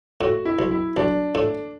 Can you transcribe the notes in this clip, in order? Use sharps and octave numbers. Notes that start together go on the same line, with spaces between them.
A2 F#4
E4
B1
E4
B1 D4
A2